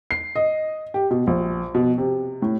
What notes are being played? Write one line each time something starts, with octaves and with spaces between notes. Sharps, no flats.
C7
D#5
G4
B2
A#1
B2
C3
A2